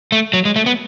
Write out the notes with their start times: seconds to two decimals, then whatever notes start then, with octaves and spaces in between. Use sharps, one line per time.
0.12 A3
0.33 F#3
0.45 G#3
0.56 A3
0.66 B3